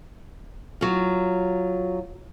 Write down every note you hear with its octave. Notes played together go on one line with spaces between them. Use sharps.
F#3 F4